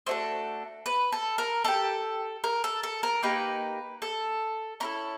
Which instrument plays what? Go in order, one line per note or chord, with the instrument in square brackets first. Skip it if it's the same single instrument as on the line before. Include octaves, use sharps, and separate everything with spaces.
[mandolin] A3 D4 F#4 A4 C5
B4
A4
A#4
D4 A4
G4
A#4
A4
A4
A#4
A#3 D#4 G4 B4
A4
C#4 E4 A4 A#4